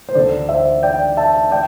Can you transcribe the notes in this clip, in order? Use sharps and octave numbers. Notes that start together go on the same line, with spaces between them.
C5
D2 D3 A4 D5
C5 E5
D5 G5
E5 A5
D5 G5